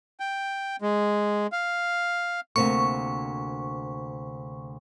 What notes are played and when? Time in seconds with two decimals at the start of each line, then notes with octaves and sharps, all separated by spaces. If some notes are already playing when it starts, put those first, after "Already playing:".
0.20 G5
0.82 G#3
1.52 F5
2.56 D2 C3 A#3 C#6